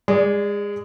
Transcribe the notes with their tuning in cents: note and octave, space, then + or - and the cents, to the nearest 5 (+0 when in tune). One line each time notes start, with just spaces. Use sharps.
G#3 -25 G#4 +0 D5 +0